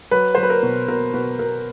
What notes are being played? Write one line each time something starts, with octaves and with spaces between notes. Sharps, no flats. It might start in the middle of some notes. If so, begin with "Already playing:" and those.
F#3 B4
C5
F#3
B4
A#4
B2
B2 A#4
B2 B4
B2 A#4